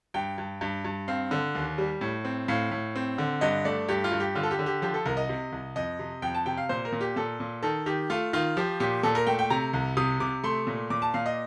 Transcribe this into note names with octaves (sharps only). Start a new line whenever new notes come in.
G2 G5
G2
G2
G2
C4 F5
D3
D#2
G3
A2
C4
A2 F5
A2
C4
D3
G2 D#5
A3 D5
G2 G4
F4
G2
G4
D3 F4
A4
G4
D3
G4
F3 G4
A4
C2 A#4
D#5
C3
C2
F2 D#5
C3
F2 G5
A5
C3 G5
F5
A#2 C5
A#4
A#2
G4
A#2 A4
A#2
D#3 A4
D#3 G4
A3 F4
D#3 F4
F3 G4
A#2 G4
A#2 A4
A#4
A3 G5
G5
C3 A#5
C2
C3 D#6
C3 D6
A3 C6
A#2
A#2 D6
A5
A#2 F5
D#5